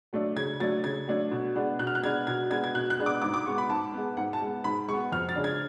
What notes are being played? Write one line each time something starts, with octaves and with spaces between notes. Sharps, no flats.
F#3 A3 D4
C#3 G#6
F#3 A3 D4 A6
C#3 G#6
F#3 A3 D4
B2
G#3 B3 D4
B2 F#6
F6
F#6
G#3 B3 D4 G#6
B2 G#6
G#3 B3 D4 G#6
G#6
B2 F#6
F#6
G#3 B3 D4
D6
G#2 D6
D6
G#3 B3 C#6
B5
G#2 A5
G#3 B3
G#2 F#5
A5
G#3 B3
G#2 B5
G#3 B3 C#6
F2 F6
A6
C#3 G#3 D4
G#6